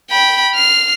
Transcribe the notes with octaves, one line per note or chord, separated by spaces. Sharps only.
G5 B5
F6 C7